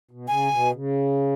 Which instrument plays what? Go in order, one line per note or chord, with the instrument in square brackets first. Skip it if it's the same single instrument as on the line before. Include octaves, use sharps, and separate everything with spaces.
[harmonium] B2
[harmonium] C#3 [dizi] G#5
[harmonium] B2
C#3